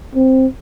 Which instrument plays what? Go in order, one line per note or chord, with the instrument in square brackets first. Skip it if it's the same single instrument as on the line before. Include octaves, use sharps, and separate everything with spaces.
[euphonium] C4